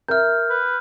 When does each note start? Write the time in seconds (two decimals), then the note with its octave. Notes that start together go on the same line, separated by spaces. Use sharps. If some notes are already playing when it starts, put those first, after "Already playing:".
0.08 A#4 E5 F6 G6
0.50 B4